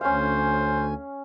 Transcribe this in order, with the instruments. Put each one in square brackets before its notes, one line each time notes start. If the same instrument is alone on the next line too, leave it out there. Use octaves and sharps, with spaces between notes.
[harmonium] D2 G#5 [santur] C#4 F5 [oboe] C5